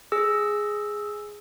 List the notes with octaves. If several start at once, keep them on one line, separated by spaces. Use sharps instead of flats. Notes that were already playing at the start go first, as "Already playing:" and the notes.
G#4 E6